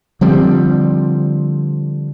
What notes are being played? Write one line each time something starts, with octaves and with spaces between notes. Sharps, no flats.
D3 F3 G3 C4